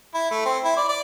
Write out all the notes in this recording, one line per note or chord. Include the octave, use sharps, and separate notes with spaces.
E4
A3
C4
E4
D5
D5